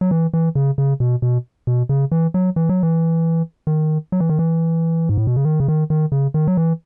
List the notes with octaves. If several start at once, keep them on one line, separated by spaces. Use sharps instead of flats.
F#3
E3
E3
C#3
C#3
B2
B2
B2
C#3
E3
F#3
E3
F#3
E3
D#3
F#3
E3
D#3
E3
G#2
A2
B2
C#3
D#3
C#3
D#3
D#3
C#3
D#3
F#3
E3